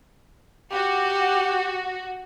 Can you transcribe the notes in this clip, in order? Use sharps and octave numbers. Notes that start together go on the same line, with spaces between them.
F#4 G4